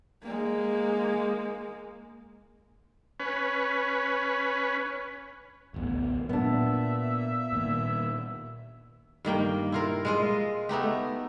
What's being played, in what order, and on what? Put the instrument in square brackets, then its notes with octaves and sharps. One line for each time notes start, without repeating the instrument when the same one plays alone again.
[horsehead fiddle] G#3 A#3
[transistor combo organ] C#4 B4
[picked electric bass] D1 A1 B3
[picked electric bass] A#2 [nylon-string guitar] B3 D4 [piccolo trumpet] E5
[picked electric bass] A#2 D#3 A#3
[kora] G2 D#3 A#3 G5
E4 F4 A#4
G#3 F4 D#5
A3 B3 D#4 G4